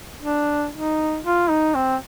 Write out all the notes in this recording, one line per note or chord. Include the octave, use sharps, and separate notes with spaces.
D4
D#4
F4
D#4
C4